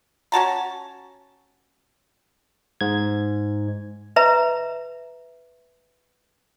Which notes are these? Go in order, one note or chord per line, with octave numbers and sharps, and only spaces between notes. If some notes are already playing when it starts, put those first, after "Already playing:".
C#4 F#4 A5 A#5
G#2 G#6
B4 E5 A#5